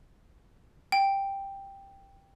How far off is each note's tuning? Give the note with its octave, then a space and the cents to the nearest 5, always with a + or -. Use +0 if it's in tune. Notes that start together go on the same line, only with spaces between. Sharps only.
G5 +5